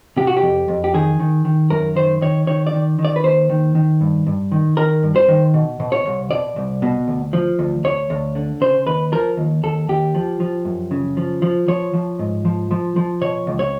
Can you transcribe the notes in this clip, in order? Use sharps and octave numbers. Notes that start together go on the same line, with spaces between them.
C3 G4
F#4
G4
F2
F2
G4
D#3 G#4
D#3
D#3
F#2 A#4
D#3 C5
D#3 C#5
D#3 C#5
D5
D#3
D#3
D5
B4
D#2 C5
D#3
D#3
G2
G2
D#3
D#3 A#4
G2
C5
D#3
B2
B2
C#5
C2
B2 D5
C2
B2
D2
F3
D2
D2 C#5
D2
D3
C#3 C5
D#2 B4
F3 A#4
D#2
D#2 A4
D#2 G4
F3
F3
F#2
C#3
F3
F3
F3 C#5
F3
G#2
F3
F3
F3
B2 C#5
C#2
C#5